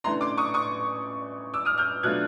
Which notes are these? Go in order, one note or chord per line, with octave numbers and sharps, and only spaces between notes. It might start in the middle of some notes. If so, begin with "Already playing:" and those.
C#3 E3 A3 D4 A#5 C6
C6 D6
C#6 D#6
C#6 D#6
D6 E6
D#6 F6
F6 G6
B2 F#3 A3 D4 F4 F#6 G#6